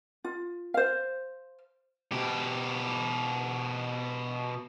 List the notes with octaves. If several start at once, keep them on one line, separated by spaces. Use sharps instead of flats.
F4
C5 F5
B2 G4